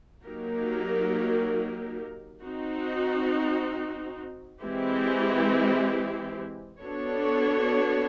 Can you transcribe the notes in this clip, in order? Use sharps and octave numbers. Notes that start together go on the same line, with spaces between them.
F#3 A#3 D#4 G4 A#4
C4 D#4 F#4
E3 G#3 C4 E4 G4
B3 D4 F#4 A4 C#5